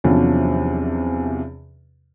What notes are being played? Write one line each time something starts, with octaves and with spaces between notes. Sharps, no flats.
E2 C3 F3 F#3 C#4 D4